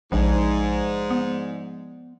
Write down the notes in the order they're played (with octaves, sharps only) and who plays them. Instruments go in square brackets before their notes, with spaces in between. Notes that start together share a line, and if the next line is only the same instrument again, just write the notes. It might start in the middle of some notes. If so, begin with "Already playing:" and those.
[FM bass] A#1 [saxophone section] G#2 [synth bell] F3 G#3 D5
[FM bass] B3